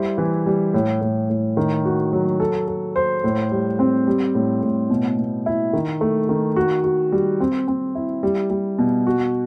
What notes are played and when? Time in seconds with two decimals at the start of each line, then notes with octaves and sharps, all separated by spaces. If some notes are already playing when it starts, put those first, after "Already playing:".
Already playing: G3 E4 C5
0.18 E3
0.46 G3
0.74 A2
1.01 A2
1.30 A2
1.57 D#3
1.85 F#4
2.13 F#3
2.40 A4
2.68 A4
2.96 C5
3.24 A2
3.52 G3
3.79 C4
4.07 G3
4.35 A2
4.63 A2
4.90 B2
5.18 B2
5.46 E4
5.73 D#3
6.01 A3
6.29 D#3
6.56 F#4
6.84 F#4
7.12 G3
7.40 C4
7.68 C4
7.95 E4
8.23 G3
8.50 G3
8.78 B2
9.07 F#4